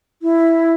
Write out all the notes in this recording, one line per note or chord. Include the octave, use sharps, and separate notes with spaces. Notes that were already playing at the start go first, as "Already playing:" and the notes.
E4